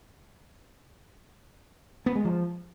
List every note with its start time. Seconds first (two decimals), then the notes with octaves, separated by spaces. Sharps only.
2.06 B3
2.16 G#3
2.25 F3